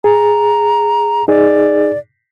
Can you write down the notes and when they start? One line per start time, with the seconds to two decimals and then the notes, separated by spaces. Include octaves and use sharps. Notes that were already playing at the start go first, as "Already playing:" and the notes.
0.04 G#4 A#5
1.28 D#4 G#4 D5